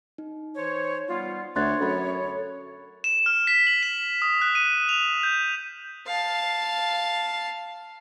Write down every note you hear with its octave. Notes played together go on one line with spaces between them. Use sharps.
D#4
E3 C5 C#5
G3 B3 F4
D2 C#5 C6 F#6 A6
F#2 A4 B5 A6
E7
F6
B6
F#7
E7
D#6
F#6
D#7
F7
G6
F5 A5